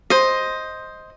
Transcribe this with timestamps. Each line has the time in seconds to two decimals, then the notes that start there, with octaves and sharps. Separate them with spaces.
0.10 C5 D#5